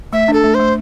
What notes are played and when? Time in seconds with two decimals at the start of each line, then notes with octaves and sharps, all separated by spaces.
0.12 A3 E5
0.28 D4 A4
0.44 A3
0.55 A3 C5